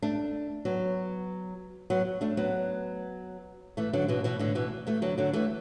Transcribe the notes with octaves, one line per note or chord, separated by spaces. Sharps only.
A3 D4
F#3 B3
F#3 B3
A3 D4
F#3 B3
E3 A3
D3 F#3
B2 E3
B2 E3
A2 D3
B2 E3
E3 A3
D3 F#3
D3 F#3
E3 A3